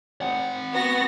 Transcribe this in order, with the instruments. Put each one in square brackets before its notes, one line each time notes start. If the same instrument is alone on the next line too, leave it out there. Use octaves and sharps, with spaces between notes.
[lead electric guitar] C4 F#5
[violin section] B3 F#4 A#6